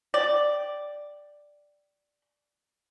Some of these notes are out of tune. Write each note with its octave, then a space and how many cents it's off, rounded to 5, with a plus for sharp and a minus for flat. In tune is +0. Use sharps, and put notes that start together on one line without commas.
D5 +0 G5 -10